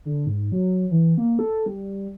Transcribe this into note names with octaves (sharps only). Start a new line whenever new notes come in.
D3
G#2
F#3
E3
A#3
A4
G3